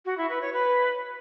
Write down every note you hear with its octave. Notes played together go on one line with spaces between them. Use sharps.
F#4
E4
B4
C#5
B4